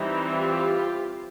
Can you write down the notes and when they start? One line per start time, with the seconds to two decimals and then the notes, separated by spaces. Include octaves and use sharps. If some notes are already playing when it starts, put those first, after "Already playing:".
Already playing: E3 G3 C4 D#4
0.36 F4 G4